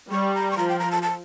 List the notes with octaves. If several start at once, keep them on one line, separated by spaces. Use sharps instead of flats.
G3 C#6
A#5
C#6
F3 A#5
G5
A#5
A5
A5